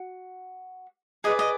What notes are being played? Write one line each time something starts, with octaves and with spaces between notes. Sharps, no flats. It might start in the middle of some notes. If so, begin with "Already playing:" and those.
Already playing: F#4
G#4 B4 D5 D#5
D#5